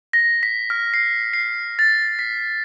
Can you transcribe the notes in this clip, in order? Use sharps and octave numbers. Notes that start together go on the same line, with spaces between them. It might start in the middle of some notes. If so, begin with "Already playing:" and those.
A#6
B6
F6
C7
C7
A6
B6